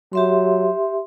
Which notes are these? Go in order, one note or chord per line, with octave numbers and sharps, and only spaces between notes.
F#3 G4 E5 C6